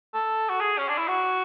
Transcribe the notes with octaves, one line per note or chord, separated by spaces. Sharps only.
A4
F#4
G#4
C#4
D4
E4
F#4